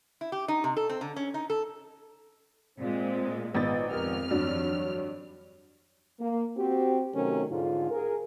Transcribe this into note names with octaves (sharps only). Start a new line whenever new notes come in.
E4
G4
D#4
C3
A4
C4
D3
C#4
D#4
A4
A#2 G#3 C4
G#1 B3 F4 B4 D#5 A6
F2 F4 G4 A#4 F6
G2 D#3 F#3 F#4 C#5 D5
A#3
C4 F#4 G4
C3 D#3 F#3 A3 C#4 A#4
G#2 D3 F4
G#4 A#4